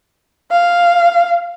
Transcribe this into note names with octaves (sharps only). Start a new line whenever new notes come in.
F5